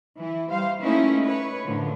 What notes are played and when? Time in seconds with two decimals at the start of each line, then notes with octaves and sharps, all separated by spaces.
0.18 E3 E4
0.49 G3 C5 F5
0.82 A3 A#3 C#4 D#4 E4 B4
1.25 B4 C#5
1.64 F#2 A2 D3 F3